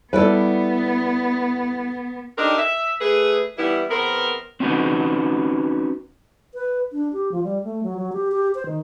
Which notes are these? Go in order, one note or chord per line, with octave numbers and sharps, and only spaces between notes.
G3 B3 E4 A4 B4 D5
C4 D4 D#4 G4 A4 A#4
E5
A3 G#4 B4
E3 G3 B3 E4
E2 B3 C4 A#4
C4 C#4 D#4 F#4 B4
B4
D4
G4
F3
G3
A3
F#3
F#3
G4
G4
C5
D#3